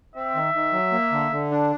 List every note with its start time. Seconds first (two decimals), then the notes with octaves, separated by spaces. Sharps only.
0.15 C4 E5
0.35 D#3
0.54 D#3
0.73 F#3
0.92 A#3
1.12 D3
1.32 D3
1.51 D4